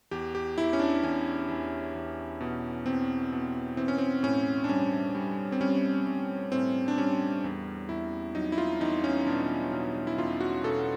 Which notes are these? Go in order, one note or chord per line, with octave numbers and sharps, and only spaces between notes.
E2 G4
G4
E2 E4
C#4
D4
E2 C#4
E2
E2
B2
E2 C4
B2
E3 C4
C#4
C4
A2 C#4
D4
G3 C#4
G3
C4
G3 C#4
G3
A2 C4
D4
G3 C#4
E2
E2 E4
F#3 D#4
E4
F4
E2 D#4
C#4
B2 D4
B2
E4
E2 F4
F#4
B2 A4